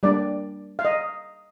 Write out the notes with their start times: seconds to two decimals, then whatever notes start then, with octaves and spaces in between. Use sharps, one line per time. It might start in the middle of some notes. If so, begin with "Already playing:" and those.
0.03 G3 A#3 D4 D5
0.79 F5
0.85 D#5